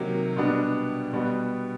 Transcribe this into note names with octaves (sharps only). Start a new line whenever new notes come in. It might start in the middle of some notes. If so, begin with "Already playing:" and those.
Already playing: C3 D#3 F#3 A#3
B2 G3 B3 D4
B2 G3 B3